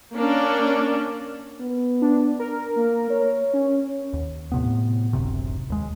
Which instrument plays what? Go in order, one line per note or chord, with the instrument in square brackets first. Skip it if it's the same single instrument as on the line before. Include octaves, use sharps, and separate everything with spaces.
[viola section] A#3 C#4 D4
[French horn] B3
[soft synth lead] D4
A#4
[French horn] A#3
C#5
[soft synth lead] C#4
[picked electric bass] D#2
A2 C3 B3
D1 G#1 F#2 C3
D#2 G#3